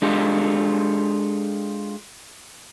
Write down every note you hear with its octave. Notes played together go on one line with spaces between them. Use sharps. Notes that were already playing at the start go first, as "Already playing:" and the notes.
G#3 D4 F4 G4 A4